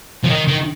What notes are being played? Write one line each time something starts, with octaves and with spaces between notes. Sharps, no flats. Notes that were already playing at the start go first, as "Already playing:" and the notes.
F3
D#3
D#3